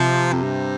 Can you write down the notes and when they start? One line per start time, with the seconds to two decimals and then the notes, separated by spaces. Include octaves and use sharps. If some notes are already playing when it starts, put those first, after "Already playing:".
Already playing: C3 F3
0.33 F2
0.42 G2